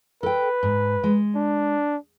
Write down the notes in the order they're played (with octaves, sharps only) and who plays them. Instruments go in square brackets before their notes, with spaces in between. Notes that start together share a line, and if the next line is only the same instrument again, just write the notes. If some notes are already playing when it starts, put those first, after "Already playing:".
[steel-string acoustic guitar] A4 G5 [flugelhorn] B4
[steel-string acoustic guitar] G#2
G#3
[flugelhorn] D4